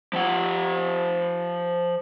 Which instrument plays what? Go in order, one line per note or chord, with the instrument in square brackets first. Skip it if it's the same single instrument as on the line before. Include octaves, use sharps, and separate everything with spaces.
[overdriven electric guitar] F3 F#5